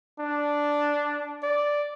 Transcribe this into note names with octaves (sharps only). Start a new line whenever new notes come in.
D4
D5